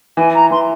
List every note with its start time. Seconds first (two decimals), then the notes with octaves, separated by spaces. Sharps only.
0.17 E3 G#5
0.34 A#5
0.51 E3 C6